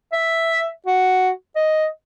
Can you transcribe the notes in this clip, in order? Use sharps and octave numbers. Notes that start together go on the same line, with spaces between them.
E5
F#4
D#5